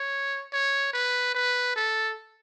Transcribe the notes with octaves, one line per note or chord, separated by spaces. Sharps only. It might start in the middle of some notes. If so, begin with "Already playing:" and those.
Already playing: C#5
C#5
B4
B4
A4